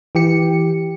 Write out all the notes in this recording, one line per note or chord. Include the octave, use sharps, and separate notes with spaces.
E3 G4 C#7